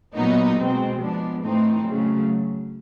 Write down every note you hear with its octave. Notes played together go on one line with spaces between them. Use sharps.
A#2 F#3 B3 D#4
B2 G#3 C4
F3 G#3 B3 D4
A2 E3 A3 C4 D#4
C#3 F#3 A3